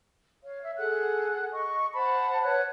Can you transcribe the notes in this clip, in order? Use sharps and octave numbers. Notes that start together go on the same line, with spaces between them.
C#5 F5
E5
G#4 A4 F#5 F#6
D#5 C#6
C5 F#5 A5 B5
B4 C#5 F#5 F#6